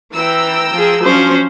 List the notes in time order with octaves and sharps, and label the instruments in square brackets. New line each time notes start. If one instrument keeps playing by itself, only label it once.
[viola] E3 [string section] G5 A#5 E6
[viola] F3 G#4
[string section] F3 F#3 D4 [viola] C#4 C5